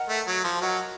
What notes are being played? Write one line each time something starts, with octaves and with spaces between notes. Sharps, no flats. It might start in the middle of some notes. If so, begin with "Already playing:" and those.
Already playing: A#4 D#5 F#5 A#5
A3
F#3
F3
F#3 A#4 D#5 F#5 A#5